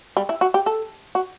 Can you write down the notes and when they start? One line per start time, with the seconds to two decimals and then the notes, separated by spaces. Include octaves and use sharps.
0.17 G3
0.29 E4
0.41 F#4
0.54 G4
0.66 A4
1.15 F#4